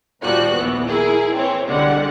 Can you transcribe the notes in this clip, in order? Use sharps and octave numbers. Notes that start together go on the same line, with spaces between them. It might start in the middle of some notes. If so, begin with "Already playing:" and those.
D#2 A#2 F3 G3 F#4 F#6
A#1 D#2 E3 B3
E4 G#4 A#4
E3 C4 C#5
C2 D3 G3 G#3 F#5